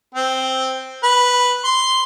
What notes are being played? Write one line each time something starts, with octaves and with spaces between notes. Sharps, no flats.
C4
B4
C6